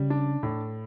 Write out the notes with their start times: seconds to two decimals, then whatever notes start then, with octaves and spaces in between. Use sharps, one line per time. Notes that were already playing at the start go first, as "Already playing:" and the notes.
Already playing: C#3 G3
0.10 D4
0.43 A2